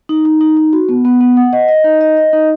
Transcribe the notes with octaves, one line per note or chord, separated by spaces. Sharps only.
D#4
D#4
D#4
D#4
F#4
B3
B3
B3
F#5
D#5
D#5
D#4
D#5
D#5
D#4